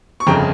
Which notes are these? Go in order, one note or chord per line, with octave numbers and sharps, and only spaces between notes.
C#6
G1 F2 C#3 G5 A#5